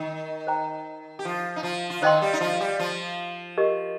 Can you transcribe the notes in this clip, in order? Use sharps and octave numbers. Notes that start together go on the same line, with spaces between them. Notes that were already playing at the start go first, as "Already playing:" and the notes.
Already playing: D#3 D#4
C5 G5 A#5
G4
F3 F4
D#4
F3 F4
F4
D#3 D#4 C5 D#5 G5 C6
G3 G4
D#4
F3 F4
G3 G4
F3 F4
G4 A#4 D#5